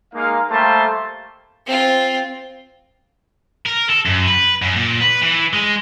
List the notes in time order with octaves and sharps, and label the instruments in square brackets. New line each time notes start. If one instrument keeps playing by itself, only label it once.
[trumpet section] G#3 A#3 D#4 F5
G3 A3 A#3 C5 A5 C6
[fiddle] C4 F4
[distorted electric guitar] A#4
A4
F#2
B4
F#2
A#2
B4
E3
G#3